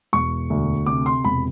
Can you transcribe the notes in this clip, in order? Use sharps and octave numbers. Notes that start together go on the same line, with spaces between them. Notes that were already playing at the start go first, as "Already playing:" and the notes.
E1 C#6
D2
C3 D6
C6
E1 B5